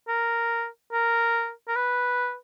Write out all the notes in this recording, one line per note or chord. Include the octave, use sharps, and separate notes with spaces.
A#4
A#4
A#4
B4